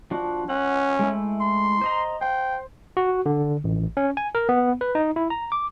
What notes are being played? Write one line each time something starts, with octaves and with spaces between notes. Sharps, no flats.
F3 D4 F#4
C#4 F#5
G#3 A3 E4
C6
C5 D#5 A#5
C5 G5
F#4
D3
A1
C#4
G#5
A#4
B3
B4
D#4
E4
A#5
D6